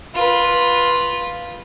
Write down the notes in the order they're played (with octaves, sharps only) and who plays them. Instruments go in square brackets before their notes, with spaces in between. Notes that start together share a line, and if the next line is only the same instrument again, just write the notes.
[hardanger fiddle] F4 B4